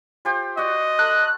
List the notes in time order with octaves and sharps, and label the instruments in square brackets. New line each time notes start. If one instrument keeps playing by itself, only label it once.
[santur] F4 G4 C5
[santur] F#4 D5 F#5 [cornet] D#5
[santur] A4 [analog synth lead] F#6